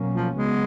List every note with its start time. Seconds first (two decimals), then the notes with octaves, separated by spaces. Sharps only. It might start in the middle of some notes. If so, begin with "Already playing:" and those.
Already playing: B2 F#3 A#3 C#4
0.14 F3
0.35 C#3 F#3 G#3 B3